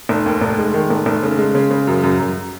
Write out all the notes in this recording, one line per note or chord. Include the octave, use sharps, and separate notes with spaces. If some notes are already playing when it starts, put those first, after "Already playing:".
F1
D#2
F1
G#3
D#3
F1
F1
C#3
G#3
C#3
C#3
F#2
F#2
F#2